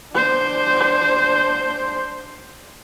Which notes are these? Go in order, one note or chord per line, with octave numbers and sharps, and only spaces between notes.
D4 C5